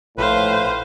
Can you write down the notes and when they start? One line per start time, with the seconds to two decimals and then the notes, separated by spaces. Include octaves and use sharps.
0.18 A#1 A2 B4 C5 F5